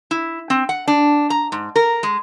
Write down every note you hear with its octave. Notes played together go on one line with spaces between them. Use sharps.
E4
C4
F#5
D4
A#5
G#2
A#4
G#3